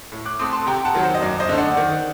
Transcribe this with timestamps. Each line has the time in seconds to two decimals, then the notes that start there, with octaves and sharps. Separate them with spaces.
0.12 A2
0.25 D6 F#6
0.39 A3 C4 C6 D#6
0.53 A5 C6
0.67 C3 G5 A#5
0.85 F#5 A5
0.94 D#3 F#3
1.03 C5
1.15 D#5
1.22 F#2 D5
1.40 C5 D#5
1.49 D3 A3
1.58 D5 F#5
1.77 D#3